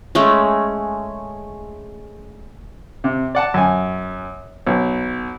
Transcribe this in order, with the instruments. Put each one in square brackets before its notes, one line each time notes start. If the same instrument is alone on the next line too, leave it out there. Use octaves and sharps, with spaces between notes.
[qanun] G#3 A3 C#4
[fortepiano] C3
D5 F#5 A5
F#2 G#5
B1